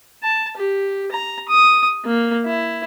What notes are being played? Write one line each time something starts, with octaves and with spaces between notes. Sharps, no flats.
A5
G4
A#5
D#6
A#3
E4